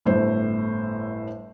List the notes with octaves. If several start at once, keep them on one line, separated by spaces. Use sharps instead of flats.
G1 A2 A3 C5